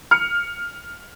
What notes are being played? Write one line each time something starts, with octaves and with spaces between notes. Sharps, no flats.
F6 C#7